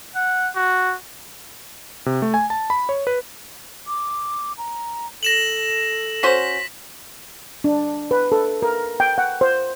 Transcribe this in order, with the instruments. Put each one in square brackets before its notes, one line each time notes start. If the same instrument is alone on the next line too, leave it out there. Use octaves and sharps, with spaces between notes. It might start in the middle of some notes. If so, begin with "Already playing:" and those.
[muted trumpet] F#5
F#4
[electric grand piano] C3
A3
G#5
A5
B5
C#5
B4
[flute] D6
A#5
[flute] A4 [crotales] A#6 E7 F#7
[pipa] C#4 F#4 C5 [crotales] B6
[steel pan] D4
B4
A4
A#4
G5
F#5
C5